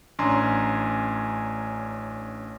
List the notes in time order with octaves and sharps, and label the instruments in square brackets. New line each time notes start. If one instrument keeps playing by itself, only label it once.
[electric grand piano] A1 C#4 D4 G#5 A#5 C6